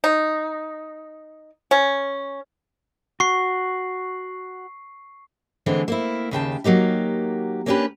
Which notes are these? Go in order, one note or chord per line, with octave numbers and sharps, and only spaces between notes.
D#4
C#4
F#4 C#6 C7
D3 E3 G#3 A3 C4
A#3 C4 E4
D#2 C#3 G5 A5
F#3 A#3 D#4 G4
A#3 B3 C#4 D4 G4 B4